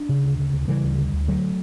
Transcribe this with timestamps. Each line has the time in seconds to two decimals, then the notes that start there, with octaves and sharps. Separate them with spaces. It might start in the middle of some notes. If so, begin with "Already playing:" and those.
Already playing: D4
0.09 C#3
0.24 D2
0.39 C#3
0.53 D2
0.68 C#3 E3 G3
0.83 D2
0.98 D3
1.13 D2
1.28 D3 F#3 A3